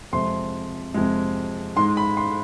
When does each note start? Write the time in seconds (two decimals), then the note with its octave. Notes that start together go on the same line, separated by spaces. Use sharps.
0.13 F2 C3 G#3 C6
0.94 F2 C3 G#3
1.76 G#2 G#3 C6
1.97 B5
2.17 C6